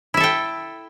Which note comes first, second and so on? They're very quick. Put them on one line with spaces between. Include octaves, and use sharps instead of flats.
E4 E5 A4 G5